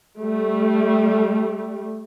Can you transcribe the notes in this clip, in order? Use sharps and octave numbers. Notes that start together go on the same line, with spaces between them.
G3 A3